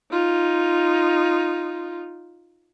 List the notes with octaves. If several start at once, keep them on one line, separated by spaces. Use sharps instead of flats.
D#4 F4